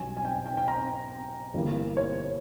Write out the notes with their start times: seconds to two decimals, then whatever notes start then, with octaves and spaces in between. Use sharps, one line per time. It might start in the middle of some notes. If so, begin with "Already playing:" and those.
Already playing: B1 B2 G3 C#4 G#5
0.17 G#5
0.25 G5
0.46 G5
0.57 G5
0.68 A#5
1.53 G1 G2 E3 G3 A#3
1.97 C#5